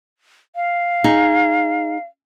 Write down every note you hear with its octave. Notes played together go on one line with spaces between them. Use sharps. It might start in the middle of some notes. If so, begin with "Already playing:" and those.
F5
D#4 G#4